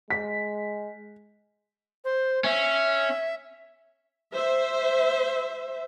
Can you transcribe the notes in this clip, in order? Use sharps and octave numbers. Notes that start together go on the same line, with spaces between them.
G#3 B6
C5
C#4 E5
C5 E5